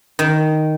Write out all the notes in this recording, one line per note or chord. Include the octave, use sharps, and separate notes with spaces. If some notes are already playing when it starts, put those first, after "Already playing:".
D#3